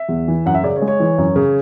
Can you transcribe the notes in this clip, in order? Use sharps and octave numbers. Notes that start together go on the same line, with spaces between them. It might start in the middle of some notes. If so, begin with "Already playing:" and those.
Already playing: E5
E2
E3
F#2 F#5
E5
C#3 D5
C#5
G#3
C#5
E3
F#2
C#3